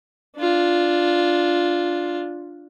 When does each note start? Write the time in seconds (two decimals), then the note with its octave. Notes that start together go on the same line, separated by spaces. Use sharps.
0.37 D4 F4